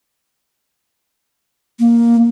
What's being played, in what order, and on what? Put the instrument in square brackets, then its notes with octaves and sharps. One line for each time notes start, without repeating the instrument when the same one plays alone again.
[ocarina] A#3